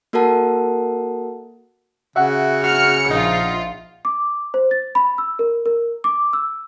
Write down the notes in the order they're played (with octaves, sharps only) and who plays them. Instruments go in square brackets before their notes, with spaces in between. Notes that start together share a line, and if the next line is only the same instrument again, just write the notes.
[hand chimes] A#3 F#4 A4 A#4 F#5 A5
[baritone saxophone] C#3 [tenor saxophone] F#4 [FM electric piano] E5 F#5
[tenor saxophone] F#4 [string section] F6 C#7
[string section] A#1 F4 [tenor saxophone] D#4
[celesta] D6
C5
A6
B5
E6
A#4
A#4
D6
E6